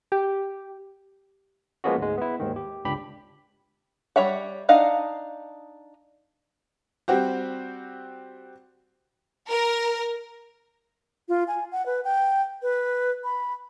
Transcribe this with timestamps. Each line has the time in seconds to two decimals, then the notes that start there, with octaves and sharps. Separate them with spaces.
0.12 G4
1.84 F3 G#3 A#3 B3 C#4 F#4
1.98 D2 G#2 G#3
2.18 B3 E4
2.40 D#2 G#2 D#3
2.56 G4
2.85 G1 C#2 D4 G4 B5
4.16 G3 C#5 E5 F#5
4.69 D4 D#4 D#5 F5 F#5
7.08 G3 C4 F#4 G4
9.48 A#4
11.29 F4
11.48 G#5
11.72 F#5
11.86 B4
12.05 G5
12.62 B4
13.24 B5